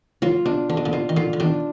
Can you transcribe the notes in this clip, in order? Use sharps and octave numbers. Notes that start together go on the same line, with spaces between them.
F#3 A#3 F4
B2 D4
D3 D4
B2
A#2 D3
B2 F4
D#3
A#2 D3 F4
D3
B2 D#3 D4